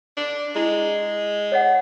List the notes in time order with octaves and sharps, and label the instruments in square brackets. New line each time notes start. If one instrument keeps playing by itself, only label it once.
[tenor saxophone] D4
[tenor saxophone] G#3 [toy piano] E4
[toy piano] C#5 D#5 F#5